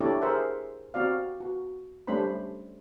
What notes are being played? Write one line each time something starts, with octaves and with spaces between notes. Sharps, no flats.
D4 E4 G4 A4 C#5 D5
G#4 A#4 C5 E5 F#5
C4 F#4 D5 F5
F#4
G3 A3 C#4 D4 C5 B5